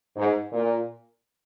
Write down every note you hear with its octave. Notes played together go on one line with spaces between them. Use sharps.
G#2
A#2